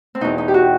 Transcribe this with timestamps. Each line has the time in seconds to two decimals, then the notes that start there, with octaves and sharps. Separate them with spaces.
0.15 C4
0.21 E2 B2 D#4
0.38 D#4
0.48 G4
0.54 F#4